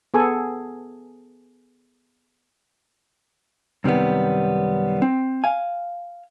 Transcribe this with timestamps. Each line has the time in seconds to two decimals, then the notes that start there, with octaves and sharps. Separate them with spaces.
0.14 B3 G#4 A4 G#5
3.84 F#2 C3 D#3 G3 B3
5.02 C4
5.44 F5 G#5